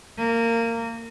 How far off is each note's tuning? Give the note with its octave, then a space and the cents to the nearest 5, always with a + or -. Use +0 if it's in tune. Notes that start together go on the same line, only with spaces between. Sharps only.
A#3 -20